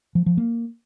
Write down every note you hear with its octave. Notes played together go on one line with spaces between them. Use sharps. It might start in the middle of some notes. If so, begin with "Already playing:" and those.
F3
F3
A#3